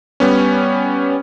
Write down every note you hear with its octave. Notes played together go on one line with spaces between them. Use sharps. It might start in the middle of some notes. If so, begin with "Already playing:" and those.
G3 B3 C#4